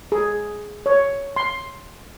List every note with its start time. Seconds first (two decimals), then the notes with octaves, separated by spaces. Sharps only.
0.12 G#4
0.86 C#5
1.36 C6